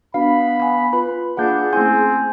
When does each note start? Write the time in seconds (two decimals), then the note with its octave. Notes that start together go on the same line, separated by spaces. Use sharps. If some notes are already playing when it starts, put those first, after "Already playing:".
0.14 B3 D4 F#4 B4 F5 B5
0.60 F#5 G#5
0.93 F4 B4 B5
1.37 A#3 D4 F4 G#4 F5 F#5 G6
1.73 A3 C4 C#4 E4 G#5 C6 G6